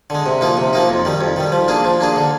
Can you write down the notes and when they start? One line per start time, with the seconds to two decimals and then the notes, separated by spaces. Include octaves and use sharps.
0.10 D3 G#3
0.26 C3
0.41 F3 A#3 D#4
0.57 C3
0.73 F3 A#3 D#4
0.89 F2
1.05 D#3 G3
1.21 F2
1.36 D#3 G3
1.52 F3
1.68 A#3 D4 G#4
1.85 F3
2.00 A#3 D4 G#4
2.16 D3